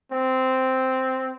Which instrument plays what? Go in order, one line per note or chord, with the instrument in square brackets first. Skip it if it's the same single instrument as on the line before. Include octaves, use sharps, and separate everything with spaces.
[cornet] C4